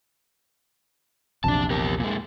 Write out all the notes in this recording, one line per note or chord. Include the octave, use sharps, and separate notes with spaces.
A#1 E2 C3 D4 A5
G4 A#4
A#2 G#3